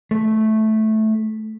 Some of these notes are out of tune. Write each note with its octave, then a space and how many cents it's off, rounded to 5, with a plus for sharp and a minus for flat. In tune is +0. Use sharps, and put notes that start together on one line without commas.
A3 -10